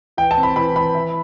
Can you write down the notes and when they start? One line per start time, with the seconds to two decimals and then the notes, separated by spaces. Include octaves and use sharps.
0.17 E3 G5
0.31 A5
0.37 C4
0.43 B5
0.56 E3 B5
0.75 E3 B5
0.95 E4